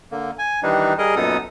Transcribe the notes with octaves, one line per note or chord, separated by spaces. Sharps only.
D3 A#3
G#5
D#3 E3 G3 D4 D#4
G3 G#4 A#4 D#5
F#2 A#2 B3 D#4 A4 D#6